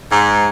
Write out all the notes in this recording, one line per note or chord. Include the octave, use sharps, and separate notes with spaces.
G#2